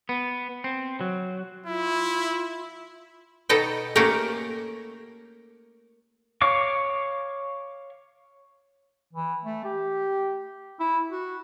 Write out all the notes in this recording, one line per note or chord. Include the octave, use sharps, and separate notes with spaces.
B3
C4
F#3
E4 F4
B2 B3 D#4 A4 D#5 G5
A3 A#3 C#4 F#4 G4 A#4
C#5 F5 C#6 D6
E3
A3
G4
E4
F#4